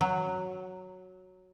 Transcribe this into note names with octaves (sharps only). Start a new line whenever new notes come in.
F#3